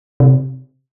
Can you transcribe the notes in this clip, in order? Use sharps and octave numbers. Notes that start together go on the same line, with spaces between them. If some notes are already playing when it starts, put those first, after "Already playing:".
C3